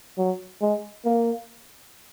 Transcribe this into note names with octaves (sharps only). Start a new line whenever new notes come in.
F#3
G#3
A#3